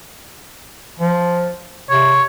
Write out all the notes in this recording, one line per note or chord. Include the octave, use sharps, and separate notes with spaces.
F3
C3 C#5